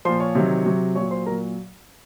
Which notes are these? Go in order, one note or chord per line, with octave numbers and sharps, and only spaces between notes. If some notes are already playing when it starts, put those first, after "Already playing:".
A#2 F3 C5 C6
C#5 C#6
C3 D#3 F#3
C3 F#3
A#2 F#3 C#5 C#6
C5 C6
A#2 F#3 A#4 A#5